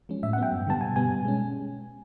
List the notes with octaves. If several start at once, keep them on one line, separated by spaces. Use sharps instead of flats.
F3 G#3 C#4
A2 E5
F#5
F#3 B3 G5
G2
D3 G3 B3 A5
B2 G#5
G3 B3 G#5
B2
G#3 C#4